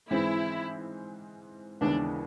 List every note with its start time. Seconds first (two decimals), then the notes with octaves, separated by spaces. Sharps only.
0.10 G#2 E3 G#3 C4 E4
1.81 D#2 C#3 E3 G#3 B3 D4